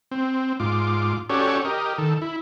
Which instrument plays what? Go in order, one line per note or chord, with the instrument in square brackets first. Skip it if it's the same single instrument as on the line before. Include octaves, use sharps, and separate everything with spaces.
[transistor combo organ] C4
G#2 F4 D6
C#4 F#4 G4 A4 C#5 D5
G4 A#4 D#5
D#3 A4
E4